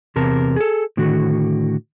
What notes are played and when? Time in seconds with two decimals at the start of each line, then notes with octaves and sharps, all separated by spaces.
0.16 E2 C3 A#4 A5
0.56 G#4 A4
0.97 A2 D3 D#3 F#4